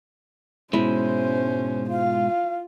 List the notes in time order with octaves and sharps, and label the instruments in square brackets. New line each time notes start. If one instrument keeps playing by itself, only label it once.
[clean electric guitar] G#2 B2 G#3 [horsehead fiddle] C#4 C5 [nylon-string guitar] E4
[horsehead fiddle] F4 [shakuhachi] F5